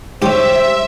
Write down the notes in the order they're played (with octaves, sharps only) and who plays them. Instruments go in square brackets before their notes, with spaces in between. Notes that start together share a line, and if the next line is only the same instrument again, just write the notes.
[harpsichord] G#2 G3 C#4 [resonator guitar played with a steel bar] G4 [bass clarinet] C5 [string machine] E5